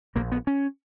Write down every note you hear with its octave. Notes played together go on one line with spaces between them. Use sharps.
A#1 A#2 A#3
B3
C#4